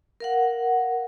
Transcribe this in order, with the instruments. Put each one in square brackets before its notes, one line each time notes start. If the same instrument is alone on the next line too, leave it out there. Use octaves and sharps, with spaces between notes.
[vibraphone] A#4 F5 F#5